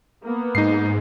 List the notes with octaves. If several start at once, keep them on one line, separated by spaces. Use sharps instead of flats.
A#3 B3
G#2 D#4 C7